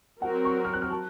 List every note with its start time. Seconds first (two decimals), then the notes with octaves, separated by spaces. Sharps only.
0.22 F#3 C4 F#4 A#4 F#5
0.45 C#6
0.65 F6
0.73 F#6
0.82 F6
0.90 A5